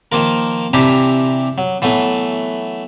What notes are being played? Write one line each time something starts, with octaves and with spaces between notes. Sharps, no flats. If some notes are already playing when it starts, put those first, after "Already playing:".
D#3 F3 A#3 F4 A#4
C3 E3 D4 E4 G4 A#5
F#3
E3 F#3 A3 B3